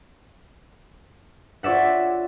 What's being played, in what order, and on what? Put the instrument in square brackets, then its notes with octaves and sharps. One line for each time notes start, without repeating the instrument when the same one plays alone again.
[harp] F4 C#5 D5 E5 F#5